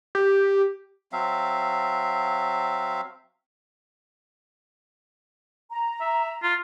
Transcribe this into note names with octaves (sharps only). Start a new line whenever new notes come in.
G4
F#3 C4 E5 F5
A#5
E5
F4